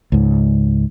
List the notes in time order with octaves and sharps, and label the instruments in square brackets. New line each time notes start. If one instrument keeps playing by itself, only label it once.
[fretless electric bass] C#2 G#2